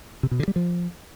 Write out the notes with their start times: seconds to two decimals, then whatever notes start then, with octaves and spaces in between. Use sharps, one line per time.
0.23 C3
0.31 B2
0.40 D3
0.48 G3
0.56 F3